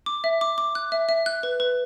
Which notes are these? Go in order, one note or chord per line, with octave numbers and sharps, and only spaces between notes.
D6
E5
D6
D6
F#6
E5
E5
F#6
B4
B4